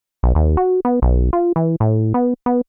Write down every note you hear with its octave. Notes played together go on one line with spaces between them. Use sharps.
B1
D#2
F#4
B3
B1
F4
E3
A2
B3
B3